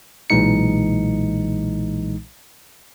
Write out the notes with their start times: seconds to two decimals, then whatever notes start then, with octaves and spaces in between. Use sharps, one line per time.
0.30 B1 A#2 E3 G#3 D#4 C#7